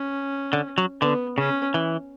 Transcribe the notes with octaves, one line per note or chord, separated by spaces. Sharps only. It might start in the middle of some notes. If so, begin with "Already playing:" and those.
Already playing: C#4
D3
F#3
D3 B3
C#3 C#4
E3